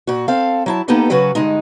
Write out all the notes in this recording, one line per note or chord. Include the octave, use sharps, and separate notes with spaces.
A#2 F#4
C4 A4 F5
F#3 E4 A5
A#3 B3 D#4 G4 A4 B4
C#3 F#3 C#4 F#4 B4
G2 D3 D#3 G#3 D#4